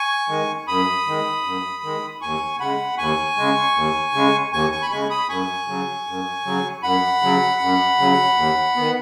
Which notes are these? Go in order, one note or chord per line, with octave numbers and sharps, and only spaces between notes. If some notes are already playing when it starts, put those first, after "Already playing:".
Already playing: G#5 C#6
D#3 G#3
F#2 B5 D#6
D#3 G#3
F#2
D#3 G#3
D#2 G#5 C#6
C#3 G#3 F#5 B5
D#2 G#5 C#6
C#3 G#3
D#2
C#3 G#3
D#2 G#5 C#6
G#5 C#6
B5
C#3 G#3 G#5 C#6
B5 D#6
F#2 G#5 C#6
C#3 F#3
F#2
C#3 F#3
F#2 F#5 B5
C#3 F#3
F#2
C#3 F#3
D#2
D#3 B3